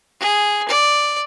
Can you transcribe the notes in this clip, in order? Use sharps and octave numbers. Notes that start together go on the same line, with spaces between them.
G#4
D5